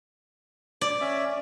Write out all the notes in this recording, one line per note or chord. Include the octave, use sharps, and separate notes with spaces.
D5
C#4 E5